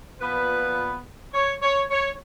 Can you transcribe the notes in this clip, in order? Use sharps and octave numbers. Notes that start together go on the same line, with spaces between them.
A#2 F3 B3 B4
C#5
C#5
C#5